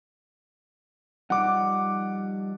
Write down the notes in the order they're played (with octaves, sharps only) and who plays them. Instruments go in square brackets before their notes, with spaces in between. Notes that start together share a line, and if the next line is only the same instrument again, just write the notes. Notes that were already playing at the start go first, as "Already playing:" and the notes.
[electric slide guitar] F3 G3 D#4 [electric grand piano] F#5 D6